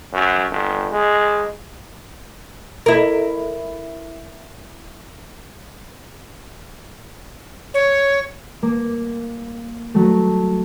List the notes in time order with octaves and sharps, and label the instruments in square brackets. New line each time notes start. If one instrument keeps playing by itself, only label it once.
[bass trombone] F#2
G1
G#3
[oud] E4 A#4
[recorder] C#5
[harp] A#3
F#3 A3